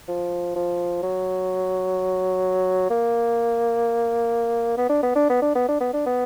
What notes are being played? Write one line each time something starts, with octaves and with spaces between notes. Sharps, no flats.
F3
F3
F#3
A#3
B3
D4
B3
D4
B3
D4
B3
D4
B3
D4
B3